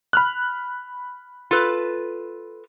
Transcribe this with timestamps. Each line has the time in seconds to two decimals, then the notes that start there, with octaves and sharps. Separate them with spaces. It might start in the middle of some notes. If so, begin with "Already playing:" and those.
0.13 B5 F6 F#6
1.51 F4 A4 B4